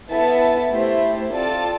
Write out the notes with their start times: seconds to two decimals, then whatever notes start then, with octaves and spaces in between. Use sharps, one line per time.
0.11 B3 E4 A4 E5 A5
0.72 A3 E4 G4 C5
1.34 C4 F4 A4 D5 A5